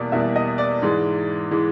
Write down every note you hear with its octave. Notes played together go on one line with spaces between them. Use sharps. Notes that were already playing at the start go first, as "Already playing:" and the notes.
Already playing: E2 B2 G3 A#3 D5
E2 B2 G3 A#3 E5
D#5
D5
G#2 E3 G#3
E3 G#3